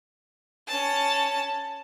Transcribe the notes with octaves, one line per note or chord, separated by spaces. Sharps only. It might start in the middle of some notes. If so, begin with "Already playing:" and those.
C#4 A5